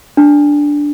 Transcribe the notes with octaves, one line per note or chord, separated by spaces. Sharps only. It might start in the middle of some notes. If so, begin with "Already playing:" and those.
D4